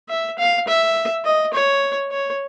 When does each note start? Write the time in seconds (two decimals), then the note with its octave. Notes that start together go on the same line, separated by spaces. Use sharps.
0.09 E5
0.38 F5
0.68 E5
1.25 D#5
1.54 C#5
2.11 C#5